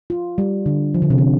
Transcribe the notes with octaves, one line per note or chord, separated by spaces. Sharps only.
F4
G3
D3
F3
D3
C3
D3